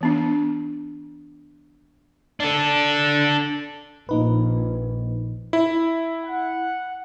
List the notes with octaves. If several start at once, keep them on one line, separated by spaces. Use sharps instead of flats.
E3 B3 D4
D4 A4
A#1 A#3 D#4 B4
E4
F#5